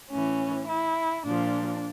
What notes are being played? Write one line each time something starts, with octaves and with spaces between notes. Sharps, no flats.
A2 E3 C#4
E4
A#2 F3 D4